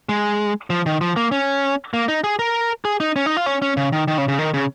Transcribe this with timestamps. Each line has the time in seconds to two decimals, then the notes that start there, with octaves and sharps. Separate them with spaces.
0.09 G#3
0.70 F3
0.86 D#3
1.01 F3
1.16 A#3
1.32 C#4
1.94 A#3
2.08 D#4
2.24 G#4
2.39 A#4
2.85 G#4
3.00 D#4
3.16 C#4
3.26 D#4
3.37 F4
3.46 C#4
3.62 C#4
3.77 C#3
3.93 D#3
4.08 D#3
4.18 C#3
4.28 C#3
4.39 D#3
4.54 C#3